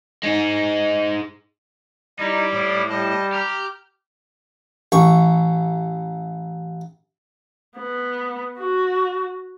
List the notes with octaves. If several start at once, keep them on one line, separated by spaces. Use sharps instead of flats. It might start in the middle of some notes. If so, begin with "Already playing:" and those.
G#3 D#4
G3 D#4 E4 G4 D5
A2
G3 D#5 A5
G4 A#5 F6
A1 C#6
B3
F#4